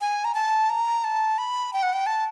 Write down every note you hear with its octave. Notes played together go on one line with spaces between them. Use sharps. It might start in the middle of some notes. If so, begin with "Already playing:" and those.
G#5
A#5
A5
A#5
A5
B5
G5
F#5
G5
A5